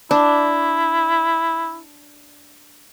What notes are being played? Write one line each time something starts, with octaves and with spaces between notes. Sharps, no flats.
D4 E4